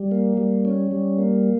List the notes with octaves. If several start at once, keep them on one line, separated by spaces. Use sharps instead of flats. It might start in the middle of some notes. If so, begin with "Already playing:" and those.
Already playing: G3
A#3
G3
C#4
G3
A#3